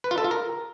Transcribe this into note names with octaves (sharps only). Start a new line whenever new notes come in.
B4
F4
A4
F4
A#4